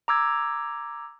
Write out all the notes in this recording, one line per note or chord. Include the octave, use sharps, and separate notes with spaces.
A#5 D6 E6 G#6